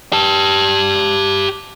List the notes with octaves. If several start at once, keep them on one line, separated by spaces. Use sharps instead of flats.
G4 A5